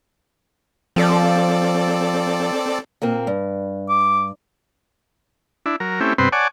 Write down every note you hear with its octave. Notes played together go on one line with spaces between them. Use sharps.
F3 C4 A4 D5
A#2 A#3 C4
G2
D6
D4 E4
F#3 A#4
A3 C4 C#4 E4 G4
G2 C3 B3 C4 B4 C6
C#5 D5 F#5 G#5 A5 D6